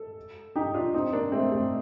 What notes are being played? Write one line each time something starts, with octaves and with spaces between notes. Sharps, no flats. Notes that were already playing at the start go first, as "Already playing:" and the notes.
Already playing: A4
D#4 G4
D4 F4
C4 D#4
A#3 D4
A3 C4
A3 C4